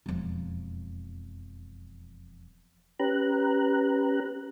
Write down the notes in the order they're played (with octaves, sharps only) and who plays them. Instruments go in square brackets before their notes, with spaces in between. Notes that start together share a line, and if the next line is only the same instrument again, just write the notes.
[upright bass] E1 F2
[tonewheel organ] C#4 G4 B4 A#5 F#6